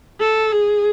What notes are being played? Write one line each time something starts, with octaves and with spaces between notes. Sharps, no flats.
A4
G#4